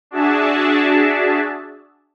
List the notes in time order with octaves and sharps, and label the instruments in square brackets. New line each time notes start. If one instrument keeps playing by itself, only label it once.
[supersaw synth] D4 F#4 G#4 E5 A5